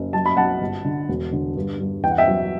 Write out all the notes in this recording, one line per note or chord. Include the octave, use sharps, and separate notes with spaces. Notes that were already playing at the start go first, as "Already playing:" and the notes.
Already playing: F#1
F#3 A5
B5
B1 F#5 A5
G1
D3
E1
D3
G2
G2
E2 G5
F#5
E5 G5
F#3